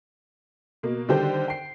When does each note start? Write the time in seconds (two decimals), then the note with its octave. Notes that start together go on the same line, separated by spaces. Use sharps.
0.83 B2 A#3
1.09 D3 D#3 G3 G4 C5
1.48 G5 C7